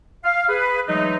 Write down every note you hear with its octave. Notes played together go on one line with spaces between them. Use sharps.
F5
G#4 B4
E3 F#3 G#3 A3 D#4